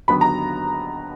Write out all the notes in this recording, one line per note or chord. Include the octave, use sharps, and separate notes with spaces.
D#2 D3 F#3 B3 B5
A#5